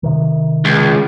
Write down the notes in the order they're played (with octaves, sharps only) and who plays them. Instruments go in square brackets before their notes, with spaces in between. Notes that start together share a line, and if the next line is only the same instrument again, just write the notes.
[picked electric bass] C3 D#3
[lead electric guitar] C#2